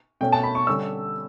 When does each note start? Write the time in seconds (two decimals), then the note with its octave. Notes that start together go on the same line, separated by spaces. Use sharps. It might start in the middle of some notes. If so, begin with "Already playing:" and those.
0.21 B2 A3 C#4 G5
0.33 A5
0.43 B5
0.55 C#6
0.67 D3 G3 C#4 E6